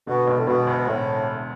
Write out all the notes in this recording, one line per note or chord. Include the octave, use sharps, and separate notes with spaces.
B2 D3
E1
A2
E1 B2
D2
E1 A2